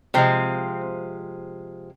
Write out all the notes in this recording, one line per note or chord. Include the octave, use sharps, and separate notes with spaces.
C3 F3 G#3 C4